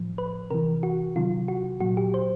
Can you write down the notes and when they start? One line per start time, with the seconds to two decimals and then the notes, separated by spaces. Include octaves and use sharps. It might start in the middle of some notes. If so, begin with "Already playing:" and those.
Already playing: A2 F3
0.18 B4
0.50 C3 E3 A#4
0.83 F#4
1.16 C3 D#3 F#3 F4
1.48 F#4
1.80 A#2 F#3 F#4
1.97 G4
2.14 C5